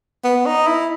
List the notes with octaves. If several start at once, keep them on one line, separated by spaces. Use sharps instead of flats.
B3
D#4
E4